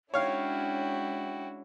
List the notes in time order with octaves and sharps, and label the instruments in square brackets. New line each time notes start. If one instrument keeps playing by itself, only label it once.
[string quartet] G#3 C#4 D4 [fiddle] E4 F#4 [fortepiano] C#5 F5 [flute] G5